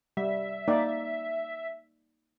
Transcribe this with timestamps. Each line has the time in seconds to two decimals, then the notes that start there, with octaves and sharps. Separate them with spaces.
0.17 G3 E5
0.68 A#3 D#4 D5